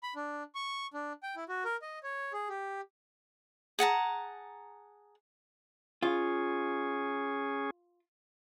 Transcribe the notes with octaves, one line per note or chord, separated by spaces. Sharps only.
B5
D4
C#6
D4
G5
E4
F#4
A#4
D#5
C#5
G#4
G4
G#4 F#5 A5 A#5
C#4 F4 G#4